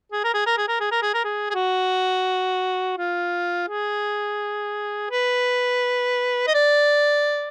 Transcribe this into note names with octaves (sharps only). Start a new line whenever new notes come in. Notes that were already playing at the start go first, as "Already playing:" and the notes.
G#4
A#4
G#4
A#4
G#4
A#4
G#4
A#4
G#4
A#4
G#4
G#4
F#4
F4
G#4
B4
D#5
D5